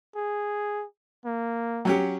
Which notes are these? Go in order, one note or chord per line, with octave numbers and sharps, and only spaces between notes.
G#4
A#3
F#3 C#4 G4